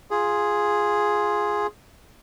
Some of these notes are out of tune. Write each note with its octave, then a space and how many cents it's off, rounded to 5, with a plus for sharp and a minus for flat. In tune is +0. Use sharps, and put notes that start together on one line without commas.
F4 +0 G#4 +0